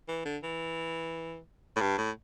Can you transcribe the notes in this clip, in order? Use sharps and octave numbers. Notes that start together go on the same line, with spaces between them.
E3
D3
E3
A2
G2
A2